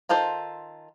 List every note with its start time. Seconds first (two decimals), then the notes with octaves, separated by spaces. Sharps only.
0.09 D#3 F4 A4 C5